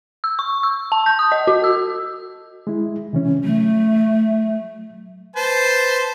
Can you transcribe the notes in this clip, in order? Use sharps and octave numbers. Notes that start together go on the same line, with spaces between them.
E6
C#6
E6
A5
G6
D#6
D#5
F#4
E6
G#3 E4
C3 E3 C#4
F#3 A3
B4 C5 A5